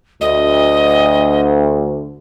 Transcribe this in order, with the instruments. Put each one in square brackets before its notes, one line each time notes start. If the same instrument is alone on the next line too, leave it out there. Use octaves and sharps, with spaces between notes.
[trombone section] D2 [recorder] D#5